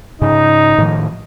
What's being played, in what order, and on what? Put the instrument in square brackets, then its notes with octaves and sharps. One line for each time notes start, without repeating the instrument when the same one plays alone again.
[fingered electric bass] G#2 C#3 [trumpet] D#4
[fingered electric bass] A2 D#3 F3